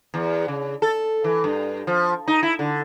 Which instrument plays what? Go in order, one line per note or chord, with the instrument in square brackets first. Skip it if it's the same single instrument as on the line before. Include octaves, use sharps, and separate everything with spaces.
[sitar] E2
C#3
A4
E3
G2
F3
D#4
E4
D3